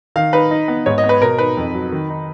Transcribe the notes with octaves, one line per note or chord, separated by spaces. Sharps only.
D#3 F5
D#4 B4
D#4
B3
G#2 C#5
D#5
B3
B4
B2 A#4
D#4 B4
F2
F#3
D#3
D#4